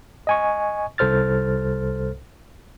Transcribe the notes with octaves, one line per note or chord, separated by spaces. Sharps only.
D#5 G#5 C#6
C2 A4 C5 F6 A6